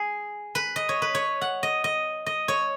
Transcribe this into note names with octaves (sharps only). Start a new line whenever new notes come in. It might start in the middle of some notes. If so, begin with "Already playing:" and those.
Already playing: G#4
B4
D#5
C#5
B4
C#5
F#5
D#5
D#5
D#5
C#5